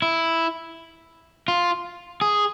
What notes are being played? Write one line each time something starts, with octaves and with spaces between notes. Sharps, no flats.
E4
F4
G#4